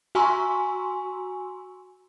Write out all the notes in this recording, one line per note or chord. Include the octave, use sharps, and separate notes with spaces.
F#4 G#5 A#5 C6 C#6 E6